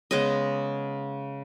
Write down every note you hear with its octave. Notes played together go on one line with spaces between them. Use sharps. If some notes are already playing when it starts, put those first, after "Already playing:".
C#3 G#3 B3 D#5